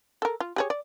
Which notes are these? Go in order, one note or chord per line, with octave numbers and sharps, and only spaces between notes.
A4 A#4
F4
G4 G#4 C#5
D5